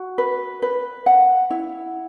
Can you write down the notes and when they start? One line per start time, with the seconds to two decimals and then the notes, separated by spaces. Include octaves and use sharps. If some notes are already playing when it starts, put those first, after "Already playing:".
Already playing: F#4
0.18 B4
0.62 B4
1.06 F#5
1.50 E4